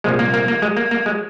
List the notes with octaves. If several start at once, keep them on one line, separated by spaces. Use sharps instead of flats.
C2 A#2 F3 G#3
A#3
A#3
A#3
G#3
A#3
A#3
G#3